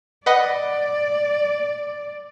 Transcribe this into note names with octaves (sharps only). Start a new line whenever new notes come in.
B4 D5 D#5 F#5